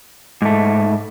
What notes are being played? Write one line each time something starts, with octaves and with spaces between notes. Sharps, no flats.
G#2 A3